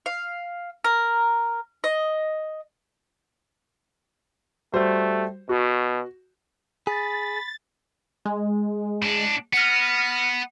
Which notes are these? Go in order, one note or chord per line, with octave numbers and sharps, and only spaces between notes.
F5
A#4
D#5
G3 A3 F#4 C5
B2 F#4
G#4 B5 A6
G#3
A2 D4
B3 F6 A#6 D#7